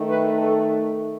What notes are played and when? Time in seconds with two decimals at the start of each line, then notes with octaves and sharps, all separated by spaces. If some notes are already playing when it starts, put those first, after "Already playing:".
Already playing: D#3 A3
0.08 B4
0.37 A4